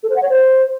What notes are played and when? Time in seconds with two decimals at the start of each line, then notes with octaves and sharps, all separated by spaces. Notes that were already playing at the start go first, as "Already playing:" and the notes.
0.03 A4
0.10 C5
0.16 F#5
0.22 C#5
0.29 C5